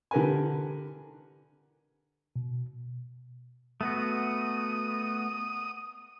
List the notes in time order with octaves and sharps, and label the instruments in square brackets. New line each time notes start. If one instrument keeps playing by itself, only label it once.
[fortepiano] D3 G4 A#4 B4 G#5
[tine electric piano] B2
[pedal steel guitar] A3 B3 F#4 [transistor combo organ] D#6